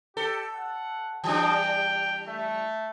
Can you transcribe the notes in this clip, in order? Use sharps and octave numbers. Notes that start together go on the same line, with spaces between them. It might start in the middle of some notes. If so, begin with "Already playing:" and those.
G4 A4
F#5
E3 G3 D4 G5
A3